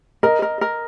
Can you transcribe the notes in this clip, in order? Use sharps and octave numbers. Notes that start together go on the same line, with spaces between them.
A#4 D#5
A#4
A#4